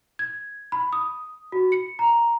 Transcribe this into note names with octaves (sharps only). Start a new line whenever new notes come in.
G#6
B5
D#6
F#4
C#7
A#5